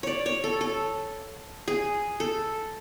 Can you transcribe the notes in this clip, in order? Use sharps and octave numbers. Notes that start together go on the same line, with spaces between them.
C#5 D5
C#5
A4
A4
G#4
A4